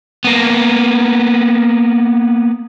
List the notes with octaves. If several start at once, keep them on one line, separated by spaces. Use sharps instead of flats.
A#3 B3